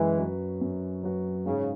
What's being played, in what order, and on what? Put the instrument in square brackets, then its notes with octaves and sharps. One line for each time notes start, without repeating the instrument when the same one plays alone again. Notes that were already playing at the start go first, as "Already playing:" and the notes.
Already playing: [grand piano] F#2 [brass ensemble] E3 G#3
[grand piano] F#3 C#4 F#4 B4
F#2
F#3 C#4 F#4 B4
[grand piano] G#2 [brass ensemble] C#3